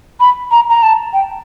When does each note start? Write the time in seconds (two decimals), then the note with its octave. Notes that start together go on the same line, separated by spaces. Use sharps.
0.20 B5
0.51 A#5
0.70 A#5
0.83 A5
1.13 G5